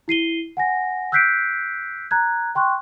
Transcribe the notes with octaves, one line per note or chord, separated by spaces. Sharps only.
E4 C7 D#7 G7
F#5 G#5 A#6
E6 F#6 G6 B6 C7 D7
A#5 F#6 G#6
G5 C6 C#6 F#6